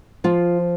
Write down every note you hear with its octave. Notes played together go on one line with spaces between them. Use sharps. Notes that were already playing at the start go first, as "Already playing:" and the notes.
F3 F4